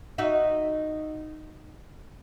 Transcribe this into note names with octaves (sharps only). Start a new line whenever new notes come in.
D#4 F#4 E5